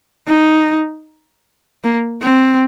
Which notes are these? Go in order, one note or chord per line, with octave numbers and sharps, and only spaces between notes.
D#4
A#3
C4